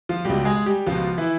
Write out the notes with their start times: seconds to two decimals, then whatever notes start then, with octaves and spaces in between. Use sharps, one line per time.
0.09 F3 F4
0.25 C#2 B2 G3 G4
0.45 G#3 G#4
0.66 G3 G4
0.87 C#2 B2 F3 F4
1.18 E3 E4